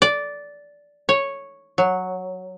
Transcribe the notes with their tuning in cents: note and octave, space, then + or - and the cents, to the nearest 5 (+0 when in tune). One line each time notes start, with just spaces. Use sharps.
D5 -10
C#5 -5
F#3 -5